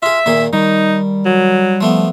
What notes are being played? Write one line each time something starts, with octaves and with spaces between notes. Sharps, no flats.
F4 G#4 E5
A#2 D#3 G#4
D#3 G3 D#4
F#3
F3 A3 B3